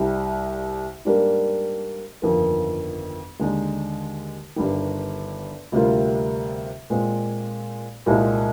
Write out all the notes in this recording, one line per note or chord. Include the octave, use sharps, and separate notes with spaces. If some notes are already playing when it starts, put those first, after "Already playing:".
Already playing: C2 C3 G3
G#2 G3 A#3 D4
G1 F2 D#3 A#3
D#2 D3 G#3 D#4
G1 G2 D#3
D2 C3 G3 A#3 F4
A#2 G#3 C4
C2 A#2 G#3 C4 D#4